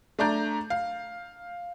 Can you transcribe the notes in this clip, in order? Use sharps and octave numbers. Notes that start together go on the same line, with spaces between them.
A3 D4 D5 A#5 G6
F5